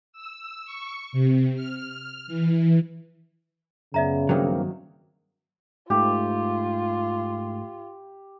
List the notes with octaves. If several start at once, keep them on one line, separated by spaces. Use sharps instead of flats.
E6
C#6
C3
F6
E3
F#2 C#3 B3 D5 E5 A#5
G2 D#3 F#3 A#3 C4
G#2 A3 F4 G4